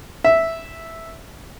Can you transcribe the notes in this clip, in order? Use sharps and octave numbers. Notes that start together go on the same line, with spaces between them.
E5